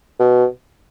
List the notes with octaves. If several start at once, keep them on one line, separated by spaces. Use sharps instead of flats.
B2